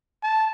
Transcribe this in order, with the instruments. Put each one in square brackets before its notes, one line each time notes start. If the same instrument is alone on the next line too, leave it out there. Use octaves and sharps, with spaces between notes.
[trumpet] A5